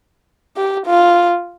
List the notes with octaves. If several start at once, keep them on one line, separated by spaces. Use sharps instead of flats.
G4
F4